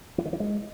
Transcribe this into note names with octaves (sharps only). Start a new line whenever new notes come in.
E3
D#3
E3
G#3